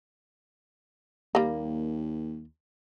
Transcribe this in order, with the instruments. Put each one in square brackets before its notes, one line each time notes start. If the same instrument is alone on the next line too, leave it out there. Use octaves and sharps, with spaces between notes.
[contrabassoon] D#2 [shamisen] G3 A#3